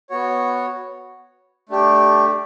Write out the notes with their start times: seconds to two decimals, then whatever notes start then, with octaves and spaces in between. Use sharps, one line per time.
0.10 B3 F#4 C#5
1.69 A3 D4 G4